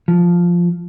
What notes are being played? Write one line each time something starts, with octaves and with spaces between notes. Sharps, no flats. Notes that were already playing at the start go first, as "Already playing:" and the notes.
F3